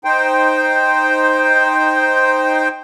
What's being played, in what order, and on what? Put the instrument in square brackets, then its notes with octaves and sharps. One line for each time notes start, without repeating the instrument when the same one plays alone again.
[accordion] D#4 C5 G5